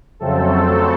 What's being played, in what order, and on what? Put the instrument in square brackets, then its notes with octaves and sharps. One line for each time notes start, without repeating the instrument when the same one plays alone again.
[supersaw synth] F2 C#3 F#3 A3 C4 A4